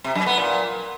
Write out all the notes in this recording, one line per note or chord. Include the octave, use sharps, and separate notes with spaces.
C3
F#2
B3
A#2